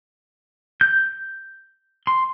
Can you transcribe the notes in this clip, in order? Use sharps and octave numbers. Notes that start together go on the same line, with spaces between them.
G6
C6